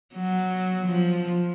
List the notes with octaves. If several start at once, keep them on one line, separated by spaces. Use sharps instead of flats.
F#3
F3